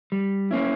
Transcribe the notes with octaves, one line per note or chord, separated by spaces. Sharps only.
G3
A#3 C#4 E4